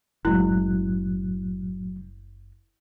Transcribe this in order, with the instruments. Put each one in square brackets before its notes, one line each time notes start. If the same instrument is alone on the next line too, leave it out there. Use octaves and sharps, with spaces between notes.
[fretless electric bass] F#1 G#3 [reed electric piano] A2 F#3 F#6 [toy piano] E4